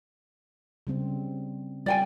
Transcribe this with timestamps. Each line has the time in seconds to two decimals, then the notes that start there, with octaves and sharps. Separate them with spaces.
0.87 C#3 G3 C4
1.86 G3 D5 G5 G#5